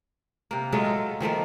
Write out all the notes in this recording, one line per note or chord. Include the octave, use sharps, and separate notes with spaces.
C3 A#3
F#3 G#3 A3 F4
A4
D#3 F3 A3 A#3